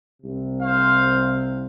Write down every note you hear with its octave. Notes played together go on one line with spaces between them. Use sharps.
C2 C3
C5 F5